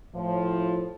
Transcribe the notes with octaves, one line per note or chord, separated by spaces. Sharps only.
A2 F3